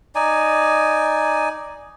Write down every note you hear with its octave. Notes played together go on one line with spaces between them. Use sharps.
D#4 D5 G#5